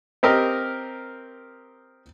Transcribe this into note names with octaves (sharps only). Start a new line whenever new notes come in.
C4 G4 A#4 D#5